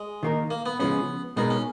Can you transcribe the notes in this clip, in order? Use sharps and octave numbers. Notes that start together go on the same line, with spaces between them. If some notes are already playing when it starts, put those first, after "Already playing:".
Already playing: G#3
D#3 A#3 D#4 A#4
A#3
B3
C#3 F3 G#3 B3 C#4
B2 G#3 B3 D#4 A#4
C#4